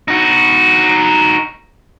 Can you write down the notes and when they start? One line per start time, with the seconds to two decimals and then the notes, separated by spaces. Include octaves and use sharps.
0.08 D#4 F#4